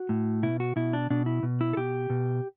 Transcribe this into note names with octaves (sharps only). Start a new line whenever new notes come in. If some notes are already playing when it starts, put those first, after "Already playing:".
Already playing: F#4
A2
B2 E4
F#4
B2 E4
D4
B2 D4
E4
B2
E4
A4
B2 G4
B2